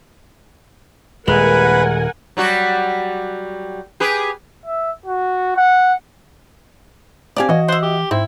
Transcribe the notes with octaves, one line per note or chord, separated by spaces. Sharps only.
D#1 G#3 A#4 B4 F#5 G#5
F#3 G3 F#4
G4 G#4 B4
E5
F#4
F#5
C4 D4 G4 D5 F5 G#5
E3 F#4 D#5
C5 E5 F#5
G4
G#2 C4 E4